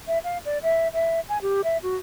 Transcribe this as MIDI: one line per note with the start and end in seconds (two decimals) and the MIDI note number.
0.07 0.18 76
0.24 0.38 77
0.45 0.58 74
0.63 0.88 76
0.93 1.20 76
1.29 1.38 80
1.42 1.61 67
1.64 1.77 76
1.83 1.96 66